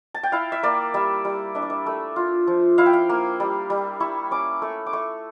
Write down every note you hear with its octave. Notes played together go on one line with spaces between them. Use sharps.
A5
G5
E4 F5
E5
A#3 D5
G3 E5
G3
D4 E5
D5
E5
A3
F4
F3
E4 F5
G5
F5
A#3
G3
G3
E4 C#6
C#4 D6
A3 C#6
D6
A3 C#6